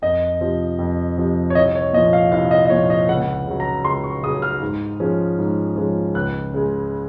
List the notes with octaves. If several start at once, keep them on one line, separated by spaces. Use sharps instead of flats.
F2 D#5
C3 F3
F2
C3 F3
C#5
C2 D#5
C#5
A#2 F3 D#5
F5
C2 F5
D#5
D#5
A#2 F3 C#5
D#5
C#2 F#5
C#3 F#3
A#5
C#2 C6
C#6
C#3 F#3 D#6
F6
G#2
F3 G#3 C#4
G#2
F3 G#3 C#4
C#2 F#6
C#3 G#3